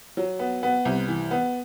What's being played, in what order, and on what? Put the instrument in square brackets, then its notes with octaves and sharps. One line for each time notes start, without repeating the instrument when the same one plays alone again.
[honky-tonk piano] F#3
B3
B3
C2
E3
B3